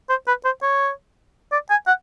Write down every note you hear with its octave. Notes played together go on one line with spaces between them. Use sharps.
C5
B4
C5
C#5
D5
G#5
F#5